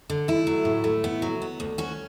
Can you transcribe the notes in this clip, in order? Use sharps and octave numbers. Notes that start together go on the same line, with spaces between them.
D3
A3 E4
F#3
A2
A3
B3
F#3
B3
D2
C#4 F#4